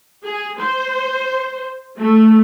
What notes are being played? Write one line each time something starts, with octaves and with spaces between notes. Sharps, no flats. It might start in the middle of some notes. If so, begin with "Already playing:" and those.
G#4
C5
A3